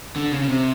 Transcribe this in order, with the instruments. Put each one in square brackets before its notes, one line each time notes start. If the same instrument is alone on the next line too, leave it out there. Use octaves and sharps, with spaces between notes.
[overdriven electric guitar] D3
C#3
C#3
C3